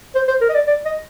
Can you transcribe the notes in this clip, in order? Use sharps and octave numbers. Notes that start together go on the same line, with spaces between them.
C5
C5
A#4
D#5
D5
D5
D#5